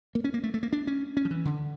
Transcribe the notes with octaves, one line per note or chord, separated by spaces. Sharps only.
A#3
C#4
A#3
A3
A3
A#3
D4
C#4
C#4
F3
E3
D3